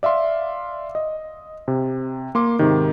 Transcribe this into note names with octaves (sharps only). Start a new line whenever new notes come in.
D5 E5 F5 C6
D#5
C3
A#3 C6 D6
G#2 C3 D#3